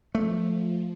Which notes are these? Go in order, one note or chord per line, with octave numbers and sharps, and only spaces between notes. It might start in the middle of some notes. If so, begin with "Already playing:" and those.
F3 A3